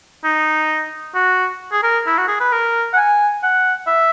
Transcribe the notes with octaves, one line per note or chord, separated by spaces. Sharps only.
D#4
F#4
G#4
A#4
E4
F#4
G#4
B4
A#4
F#5
G#5
F#5
E5